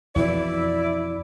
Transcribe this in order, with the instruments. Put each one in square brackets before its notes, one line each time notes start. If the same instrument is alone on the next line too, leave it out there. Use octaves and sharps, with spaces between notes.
[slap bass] F2 B2 E3 [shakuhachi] E4 [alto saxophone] D5